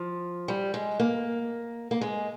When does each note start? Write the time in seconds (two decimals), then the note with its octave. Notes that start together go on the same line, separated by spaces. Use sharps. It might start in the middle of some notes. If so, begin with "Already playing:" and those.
Already playing: F3
0.48 G3
0.74 G#3
1.00 A#3
1.91 A#3
2.01 G#3